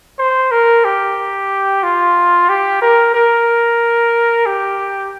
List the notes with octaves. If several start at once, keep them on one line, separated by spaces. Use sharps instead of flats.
C5
A#4
G4
F4
G4
A#4
A#4
G4